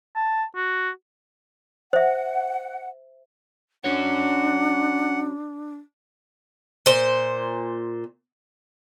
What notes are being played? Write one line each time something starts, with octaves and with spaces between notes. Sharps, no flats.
A5
F#4
C5 E5 F#5
C#4 D4 F#4 C#5 F#5
A#2 C5